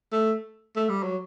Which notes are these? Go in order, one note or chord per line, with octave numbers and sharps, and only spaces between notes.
A3
A3
G3
F#3